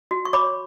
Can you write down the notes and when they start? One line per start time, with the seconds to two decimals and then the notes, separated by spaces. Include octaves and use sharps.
0.11 F#4
0.25 C#6
0.33 C#5 B5 D6